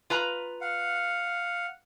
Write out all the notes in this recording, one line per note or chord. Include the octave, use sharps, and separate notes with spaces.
F4 B4 A#5
F5 F#5